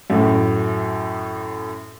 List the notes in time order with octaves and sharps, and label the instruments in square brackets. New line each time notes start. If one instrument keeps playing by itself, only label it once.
[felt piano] F#2 A2